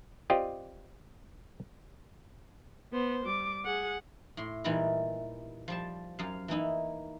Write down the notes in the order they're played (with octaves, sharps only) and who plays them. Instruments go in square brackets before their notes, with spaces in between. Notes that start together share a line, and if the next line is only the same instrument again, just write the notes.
[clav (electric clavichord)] C4 F4 G4 D5 D#5
[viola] B3 C5
G3 D6
G#4 F#5
[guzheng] A2 C6
A#2 E3 G3 D#4 E4 A#4
F3 G3 A5
F#2 F5
E3 A#3 D#4 E4